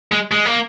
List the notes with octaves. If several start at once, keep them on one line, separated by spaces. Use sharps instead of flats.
G#3
G#3
A#3